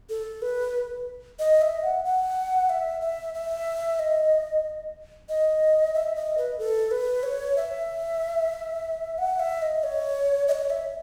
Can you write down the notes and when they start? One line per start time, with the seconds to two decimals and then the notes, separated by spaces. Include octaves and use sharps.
0.09 A4
0.42 B4
1.39 D#5
1.62 E5
1.83 F#5
2.05 F#5
2.70 E5
3.01 E5
3.35 E5
3.99 D#5
5.29 D#5
5.94 E5
6.15 D#5
6.38 B4
6.59 A4
6.91 B4
7.23 C#5
7.57 E5
9.18 F#5
9.40 E5
9.62 D#5
9.84 C#5
10.48 D#5
10.52 C#5
10.70 E5